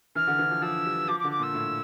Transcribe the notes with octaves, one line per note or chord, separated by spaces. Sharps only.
E3 F6
D3
E3
F3
F3 E6
G3
F3 D6
D6
D3
D6
A#2 E6
A2